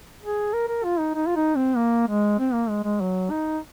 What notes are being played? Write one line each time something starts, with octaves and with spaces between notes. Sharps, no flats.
G#4
A#4
A#4
F4
D#4
D#4
F4
D#4
C4
A#3
G#3
C4
A#3
G#3
G#3
F#3
D#4